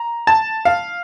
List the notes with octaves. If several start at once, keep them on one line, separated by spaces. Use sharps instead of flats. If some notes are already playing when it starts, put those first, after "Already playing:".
Already playing: A#5
A5
F5